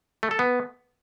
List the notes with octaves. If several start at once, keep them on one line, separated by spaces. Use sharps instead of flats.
A3
A4
B3